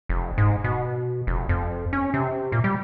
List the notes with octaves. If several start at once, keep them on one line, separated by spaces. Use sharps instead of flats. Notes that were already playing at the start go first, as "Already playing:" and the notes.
F1
G#2
B2
F1
F2
C#4
C3
A#2
G3